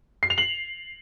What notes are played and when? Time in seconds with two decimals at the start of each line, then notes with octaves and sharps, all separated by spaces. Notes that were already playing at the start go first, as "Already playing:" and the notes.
0.23 C7
0.30 F7
0.38 F#7